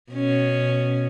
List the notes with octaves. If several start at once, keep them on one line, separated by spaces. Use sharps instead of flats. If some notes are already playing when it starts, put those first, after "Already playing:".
B2 C#4